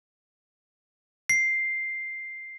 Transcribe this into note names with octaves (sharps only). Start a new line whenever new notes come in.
C7